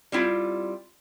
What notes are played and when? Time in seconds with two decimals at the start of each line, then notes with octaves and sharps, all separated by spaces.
0.12 G3 C4 E4 F4